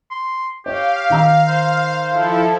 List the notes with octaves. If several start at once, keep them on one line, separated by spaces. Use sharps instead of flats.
C6
G4 C#5 F5
D#3 A#5 E6
C5
F3 E4 A4